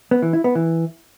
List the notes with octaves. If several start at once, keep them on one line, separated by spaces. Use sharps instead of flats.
B3
E3
E4
B3
E3